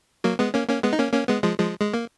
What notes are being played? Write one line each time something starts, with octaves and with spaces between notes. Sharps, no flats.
F#3 A#3
G#3 B3
A#3 C#4
A#3 C#4
G#3 B3
D#4
A#3 C#4
A#3 C#4
G#3 B3
F3 G#3
F3 G#3
G#3
A#3